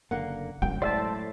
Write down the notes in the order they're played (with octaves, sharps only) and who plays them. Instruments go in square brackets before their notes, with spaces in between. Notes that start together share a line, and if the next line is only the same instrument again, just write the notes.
[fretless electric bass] F#1 D3 A#3 [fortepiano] F#5
[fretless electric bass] G1 F#2 [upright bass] F#3 G#3 [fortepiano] G5
[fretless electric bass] A2 [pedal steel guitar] C5 E5 A5 [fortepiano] D5